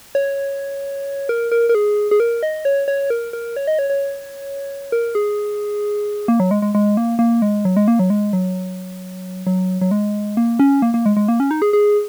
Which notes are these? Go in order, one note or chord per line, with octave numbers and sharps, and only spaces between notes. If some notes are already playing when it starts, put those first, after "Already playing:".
C#5
A#4
A#4
A#4
G#4
G#4
A#4
D#5
C#5
C#5
A#4
A#4
C#5
D#5
C#5
C#5
A#4
G#4
A#3
F#3
G#3
G#3
G#3
A#3
A#3
G#3
F#3
G#3
A#3
F#3
G#3
F#3
F#3
F#3
G#3
A#3
C#4
A#3
A#3
G#3
G#3
A#3
C#4
D#4
G#4
G#4